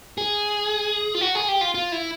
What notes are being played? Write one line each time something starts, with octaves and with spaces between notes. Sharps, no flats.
G#4
F4
F#4
G#4
G4
F4
F4
E4